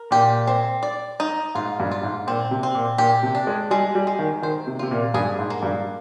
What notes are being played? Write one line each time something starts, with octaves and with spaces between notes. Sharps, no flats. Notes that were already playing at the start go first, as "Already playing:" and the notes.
Already playing: A#4
A#2 G4
C4
D5
D#4
G#2 F4
G2
F4
G#2
A#2 C4
C3
C4
A#2
A#2 G4
C3
D4
G#3
G3 G#3
G3
G#3
D#3
D#3 C5
C3
C3 F4
A#2
G2 G#4
G#2
A#3
G2